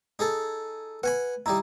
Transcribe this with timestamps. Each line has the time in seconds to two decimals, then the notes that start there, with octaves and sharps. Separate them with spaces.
0.19 D#4 G#4 A4
1.03 B4 F#5 G#5 B5
1.46 G3 D#4 E4 A#5